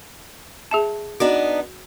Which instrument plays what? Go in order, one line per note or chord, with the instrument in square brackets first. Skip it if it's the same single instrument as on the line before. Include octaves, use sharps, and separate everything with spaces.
[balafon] G#4 E5 A5
[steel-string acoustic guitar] B3 D4 D#4 [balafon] F#4